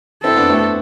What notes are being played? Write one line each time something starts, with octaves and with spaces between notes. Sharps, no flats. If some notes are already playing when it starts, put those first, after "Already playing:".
C4 E4 A4
B3 D4
A3 C4